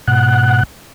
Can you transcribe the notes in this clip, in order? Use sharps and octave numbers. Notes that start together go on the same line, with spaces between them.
G#2 B2 F#5 F#6